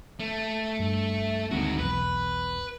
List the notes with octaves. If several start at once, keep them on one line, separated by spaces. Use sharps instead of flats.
A3
G2
D2 D#3 G#3 C4 F#4
B1 E2 B4